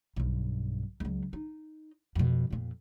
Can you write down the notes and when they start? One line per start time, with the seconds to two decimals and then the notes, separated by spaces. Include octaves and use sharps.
0.16 B1 G2
1.00 C#2 F#3
1.33 D#4
2.15 F2 B2
2.50 F2 A#2